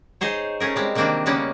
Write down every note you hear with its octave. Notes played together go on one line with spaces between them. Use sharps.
D#4 G#4 C5 C#5
A3 C#4 G#4 A#4
G3 G#3 C4
C3 D#3 E3 A#3 C4 D4
C#3 G3 G#3 A#3 B3 C#4